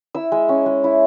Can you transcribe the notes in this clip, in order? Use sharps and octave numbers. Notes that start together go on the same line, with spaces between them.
E4 E6
G#3
C#4
G#3
E4